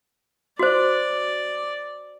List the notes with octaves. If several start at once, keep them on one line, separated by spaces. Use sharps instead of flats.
F#4 C5 D5